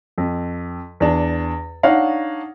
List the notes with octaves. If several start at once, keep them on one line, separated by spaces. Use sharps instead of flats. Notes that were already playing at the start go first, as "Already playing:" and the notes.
F2
E2 D4
D4 D#4 C#5 F5 F#5